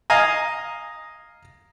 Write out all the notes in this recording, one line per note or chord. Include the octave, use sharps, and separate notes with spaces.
D#5 F5 G#5 A#5